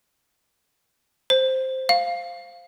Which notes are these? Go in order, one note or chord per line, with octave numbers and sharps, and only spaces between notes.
C5
F5